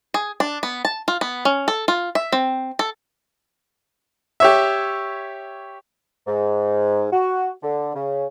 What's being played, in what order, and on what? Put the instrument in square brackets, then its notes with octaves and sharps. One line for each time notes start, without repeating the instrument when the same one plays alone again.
[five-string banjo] G#4
D4
B3
A5
F4
B3
C#4
A4
F4
E5
C4
A4
[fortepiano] G4 C#5 E5
[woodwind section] G#2
F#4
D3
C#3